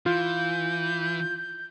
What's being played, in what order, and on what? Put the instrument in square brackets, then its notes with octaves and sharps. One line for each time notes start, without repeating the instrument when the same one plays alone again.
[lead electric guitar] E3 [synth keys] F4 [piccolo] G6